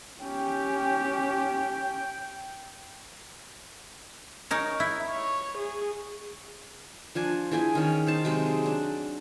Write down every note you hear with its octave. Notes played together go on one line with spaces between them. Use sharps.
C#4 G4 G5
D#4 A#4 C#5
E4
C#5
G#4
F3 D4 G#5
E3 G#4 G5 G#5
D#3 C#4
D#4 C5 A5
C3 F#3 G#3
D4